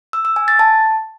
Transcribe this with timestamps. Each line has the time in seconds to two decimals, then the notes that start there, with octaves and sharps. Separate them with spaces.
0.13 E6
0.25 E6
0.36 G#5
0.48 A6
0.59 A5